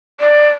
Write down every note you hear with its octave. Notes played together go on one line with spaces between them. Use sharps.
D5